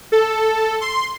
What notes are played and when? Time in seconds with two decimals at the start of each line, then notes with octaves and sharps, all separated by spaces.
0.12 A4
0.81 C6